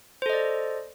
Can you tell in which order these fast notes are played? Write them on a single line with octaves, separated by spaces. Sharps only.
C5 A4 D#5 D5